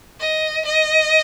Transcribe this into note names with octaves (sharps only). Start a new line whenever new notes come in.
D#5
D#5